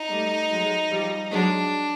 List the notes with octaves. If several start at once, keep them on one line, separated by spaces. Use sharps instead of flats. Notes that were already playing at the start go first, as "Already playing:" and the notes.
Already playing: D#4
G3 A3
F#3 G#3
F3 G3
F#3 G#3 D4